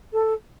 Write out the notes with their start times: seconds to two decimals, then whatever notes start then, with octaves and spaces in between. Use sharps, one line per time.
0.13 A4